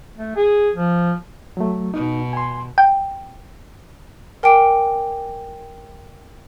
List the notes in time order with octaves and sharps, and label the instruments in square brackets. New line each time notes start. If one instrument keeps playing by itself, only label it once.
[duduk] A3
G#4
F3
[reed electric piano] F#3 A3
[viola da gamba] B2 [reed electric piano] D#4
[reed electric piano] G#5 C6
[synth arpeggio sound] G5
[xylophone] A#4 G5 G#5 D6 D7